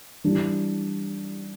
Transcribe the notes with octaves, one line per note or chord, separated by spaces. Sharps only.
E3 G3 D4